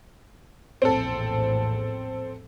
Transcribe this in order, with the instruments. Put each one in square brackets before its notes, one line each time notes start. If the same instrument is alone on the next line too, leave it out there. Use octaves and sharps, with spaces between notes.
[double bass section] A#1 E2 A2 [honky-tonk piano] C4 A4